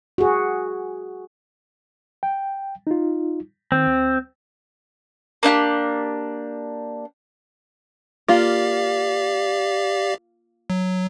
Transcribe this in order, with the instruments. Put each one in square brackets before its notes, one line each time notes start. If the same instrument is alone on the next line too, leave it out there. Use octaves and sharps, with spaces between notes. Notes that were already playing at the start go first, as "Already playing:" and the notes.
[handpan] F#4 G#4
[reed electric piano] G5
D#4 F4
[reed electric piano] D#3 [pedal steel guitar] C4
[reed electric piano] D2
[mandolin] A#3 D4 E4 G4
[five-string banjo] A#3 F4 [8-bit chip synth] G4 D5 F5
[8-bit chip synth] F#3